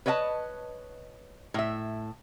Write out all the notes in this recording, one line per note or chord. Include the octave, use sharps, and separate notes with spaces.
B4 C#5 D#5 E5 A5
A2 E5